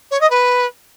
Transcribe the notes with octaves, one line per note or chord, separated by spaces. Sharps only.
C#5
D#5
B4